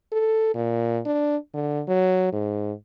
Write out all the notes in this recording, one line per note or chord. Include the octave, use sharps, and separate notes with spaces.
A4
A#2
D4
D3
F#3
G#2